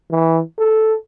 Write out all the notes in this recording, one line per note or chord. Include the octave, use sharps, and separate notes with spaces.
E3
A4